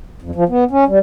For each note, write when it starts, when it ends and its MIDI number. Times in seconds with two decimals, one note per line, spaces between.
0.22 0.31 41
0.35 0.44 53
0.49 0.64 59
0.71 0.84 61
0.88 0.99 55